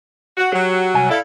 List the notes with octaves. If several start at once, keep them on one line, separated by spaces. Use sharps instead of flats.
F#4
F#3 G4
C2 G#5
E4 A4 D5 F5